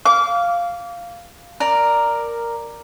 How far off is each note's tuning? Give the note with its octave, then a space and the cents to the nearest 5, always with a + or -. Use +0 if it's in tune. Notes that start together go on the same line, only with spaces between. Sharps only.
F5 -5 D6 -30
A#4 +0 D5 +5